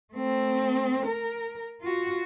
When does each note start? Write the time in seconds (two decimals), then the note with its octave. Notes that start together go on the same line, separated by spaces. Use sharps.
0.14 A3 C4
1.06 A#4
1.81 F4 F#4